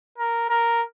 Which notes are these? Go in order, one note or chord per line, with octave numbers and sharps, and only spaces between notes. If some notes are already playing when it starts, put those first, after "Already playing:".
A#4
A#4